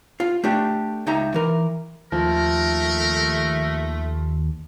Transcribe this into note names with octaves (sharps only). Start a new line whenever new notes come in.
F4
A3 D4 G4
C#2 D#4 E5 A#5
E3 A#4
D#2 F3 A3 A#4